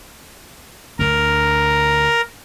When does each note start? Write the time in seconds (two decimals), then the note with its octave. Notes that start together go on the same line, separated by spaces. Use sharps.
0.99 D2 D4 A#4